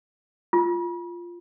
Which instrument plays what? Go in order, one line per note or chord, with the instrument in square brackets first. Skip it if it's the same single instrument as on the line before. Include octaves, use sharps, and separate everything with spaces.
[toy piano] F4